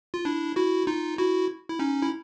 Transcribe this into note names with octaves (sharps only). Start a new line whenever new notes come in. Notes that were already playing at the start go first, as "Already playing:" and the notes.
F4
D4 E4
E4 F#4
D#4 F4
E4 F#4
E4
C#4 D#4
E4